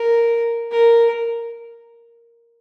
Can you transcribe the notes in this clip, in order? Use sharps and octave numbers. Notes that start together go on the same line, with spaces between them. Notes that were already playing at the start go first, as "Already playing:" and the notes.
Already playing: A#4
A#4